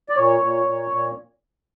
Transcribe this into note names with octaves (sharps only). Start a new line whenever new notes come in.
D5
A#2 C#5
A#2
A#2
A#2